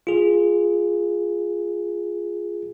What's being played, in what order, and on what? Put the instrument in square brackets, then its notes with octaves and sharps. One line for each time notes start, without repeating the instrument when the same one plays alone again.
[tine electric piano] F4 G#4